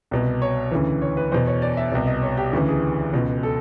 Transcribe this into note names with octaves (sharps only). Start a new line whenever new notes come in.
C2 B2
C#5
D2 C#3 E3
C#5
B4
E2 B2 C5
C#5
D5
E5
C2 B2
D#5
C#5
G4
D2 C#3 E3
G#4
C#2 B2
A4